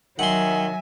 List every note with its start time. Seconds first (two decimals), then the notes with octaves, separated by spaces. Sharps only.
0.19 D#3 F#3 E5 F#5 G#5 C6